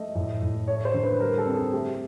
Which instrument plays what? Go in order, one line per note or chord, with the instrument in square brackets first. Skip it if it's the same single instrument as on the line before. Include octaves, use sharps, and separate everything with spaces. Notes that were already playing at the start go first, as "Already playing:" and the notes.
Already playing: [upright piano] A3 [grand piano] D#5
[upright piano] A2
A2
[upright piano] A3 [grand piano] C#5
[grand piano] C5
[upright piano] D3
[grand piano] B4
[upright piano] G3 [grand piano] A#4
[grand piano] A4
[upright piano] C4
[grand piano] G#4
[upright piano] A3 [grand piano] G4